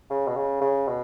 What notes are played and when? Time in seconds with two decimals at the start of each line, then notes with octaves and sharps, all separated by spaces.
0.11 C#3
0.28 B2
0.36 C#3
0.61 C#3
0.88 B2